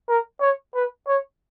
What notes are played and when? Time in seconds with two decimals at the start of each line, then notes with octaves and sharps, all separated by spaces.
0.09 A#4
0.41 C#5
0.75 B4
1.08 C#5